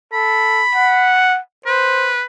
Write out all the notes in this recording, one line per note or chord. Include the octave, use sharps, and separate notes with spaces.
A4 B5
F#5
B4 C5